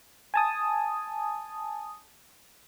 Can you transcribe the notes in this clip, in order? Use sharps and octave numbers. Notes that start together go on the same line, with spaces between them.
G#5 A5 D#6